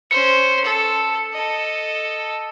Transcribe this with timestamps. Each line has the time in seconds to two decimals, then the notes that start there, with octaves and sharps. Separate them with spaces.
0.11 C#4 C5 C#7
0.64 A4
1.33 A4 D#5